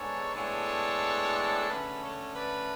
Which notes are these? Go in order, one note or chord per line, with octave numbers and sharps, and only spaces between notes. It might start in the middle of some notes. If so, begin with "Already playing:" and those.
Already playing: G#2 G#3 B3 D4 A4 C#5
A2 G#3 B3 D4 A4 C#5
D3 A3 C#4 G#4 B4
A4 C#5
B4 D5